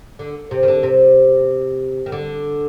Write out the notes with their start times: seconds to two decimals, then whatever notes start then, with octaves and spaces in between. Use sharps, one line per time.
0.19 D3
0.51 C3
0.63 D#3
0.68 D3
0.83 C3
2.06 D#3
2.12 D3